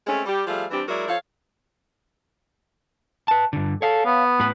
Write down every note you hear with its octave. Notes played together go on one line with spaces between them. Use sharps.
G#3 A3 C4 C#4
G3 G4
F3 G3 A3 G#4 F5
E3 G3 C4 D4 G4
F#3 G#3 E4 A#4 D5
F3 A4 C#5 F5
B4 A5
G2 D3
A4 C#5 F5
B3
A2 B4